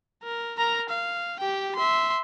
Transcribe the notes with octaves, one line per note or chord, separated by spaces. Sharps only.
A#4
A#4 A#5
F5
G4 G5
E5 C6